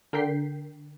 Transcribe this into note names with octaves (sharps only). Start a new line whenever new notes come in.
D3 A#4 G5 G6 B6 C7